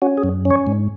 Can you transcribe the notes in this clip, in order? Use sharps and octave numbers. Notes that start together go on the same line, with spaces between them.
C#4 F#4
G#4
F#2
C#4
C#5
G#2